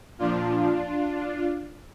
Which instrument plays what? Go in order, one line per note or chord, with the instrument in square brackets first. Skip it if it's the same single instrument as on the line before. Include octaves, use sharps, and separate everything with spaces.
[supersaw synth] A#2 F3 D4 F4